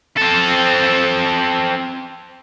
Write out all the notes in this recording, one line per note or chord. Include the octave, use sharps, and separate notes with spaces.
C4 A4